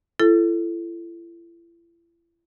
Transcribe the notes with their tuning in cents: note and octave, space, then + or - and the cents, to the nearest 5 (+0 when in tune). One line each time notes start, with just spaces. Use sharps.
E4 +40 A4 +0